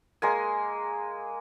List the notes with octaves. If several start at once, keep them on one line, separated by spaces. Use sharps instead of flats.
G#3 A#3 G#5